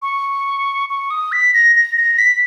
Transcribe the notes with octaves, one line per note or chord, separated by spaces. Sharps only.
C#6
C#6
D#6
B6
A#6
A#6
A#6
B6